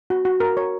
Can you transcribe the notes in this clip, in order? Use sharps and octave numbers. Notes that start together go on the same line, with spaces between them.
F#4
F#4
A#4
C#5